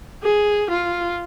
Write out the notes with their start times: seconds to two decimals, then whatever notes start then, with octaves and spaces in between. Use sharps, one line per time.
0.23 G#4
0.70 F4